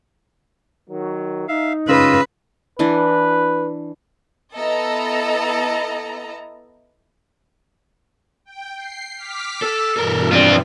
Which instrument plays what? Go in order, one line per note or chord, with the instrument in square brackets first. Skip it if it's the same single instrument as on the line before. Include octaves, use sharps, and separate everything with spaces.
[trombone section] D#3 F#3
[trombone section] D#4 [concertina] E5 F5
[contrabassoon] C#3 [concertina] F4 D#5 E6 [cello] B4
[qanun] E3 D4 [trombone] B4
[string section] B3 E4 A4 D#5 A5 A#5
[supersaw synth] G5
C7
D6 F6 B6
[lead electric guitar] A4
[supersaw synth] G2 B2 E3 [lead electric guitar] A4 A#4
[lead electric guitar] F2 D4 [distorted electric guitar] C4 F4